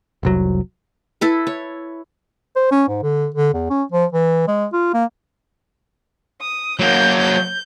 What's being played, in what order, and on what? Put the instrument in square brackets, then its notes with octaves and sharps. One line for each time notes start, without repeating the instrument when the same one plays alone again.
[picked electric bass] F1 C2 F#3
[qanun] E4 A4 B4
C#5
[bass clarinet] C5
C#4
G#2
D3
D3
E2
C#4
F3
E3
G#3
F4
A#3
[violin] D#6
[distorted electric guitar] F#3 A#3 [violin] G6
[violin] G6